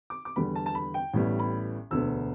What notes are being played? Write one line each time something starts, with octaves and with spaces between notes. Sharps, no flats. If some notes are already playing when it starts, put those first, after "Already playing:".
D6
D6
E2 D3 G3 B3 B5
A5
A5
B5
G5
A1 A2 G3 B3
B5
E1 D2 D3 B3 E6